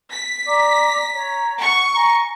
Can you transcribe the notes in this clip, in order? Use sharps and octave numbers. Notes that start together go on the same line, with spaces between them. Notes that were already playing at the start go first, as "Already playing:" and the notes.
B6
D5 A#5 D6
C#5 A#5
F#5 C#6
G#5 A#5